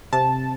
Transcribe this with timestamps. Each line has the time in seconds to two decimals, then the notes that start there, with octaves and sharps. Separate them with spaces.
0.13 C3 A5